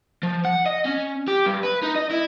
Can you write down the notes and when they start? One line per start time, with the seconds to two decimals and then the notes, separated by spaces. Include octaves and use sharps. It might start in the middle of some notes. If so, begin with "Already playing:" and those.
0.23 F3
0.45 F#5
0.66 D#5
0.86 C#4
1.28 G4
1.46 G2
1.63 B4
1.83 D#4
1.96 D#5
2.11 E4